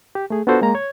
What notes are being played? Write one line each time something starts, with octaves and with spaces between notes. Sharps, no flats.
G4
A3 G#4
B3 D4 F4 F#4 A4 C5
G#3 A#3 A#5
C#5 G#6